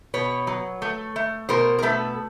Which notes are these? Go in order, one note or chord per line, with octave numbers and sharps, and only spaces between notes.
B2 B4 C#5
F#3
A3
A3
B2 A#4 C5
A#4
A3 A4 B4